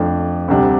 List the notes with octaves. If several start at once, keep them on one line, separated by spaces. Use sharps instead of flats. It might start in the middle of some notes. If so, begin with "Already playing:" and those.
Already playing: F2 F3 A3 D4
D2 C3 G3 D4